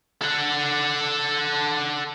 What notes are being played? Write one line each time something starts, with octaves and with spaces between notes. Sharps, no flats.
A4 F#5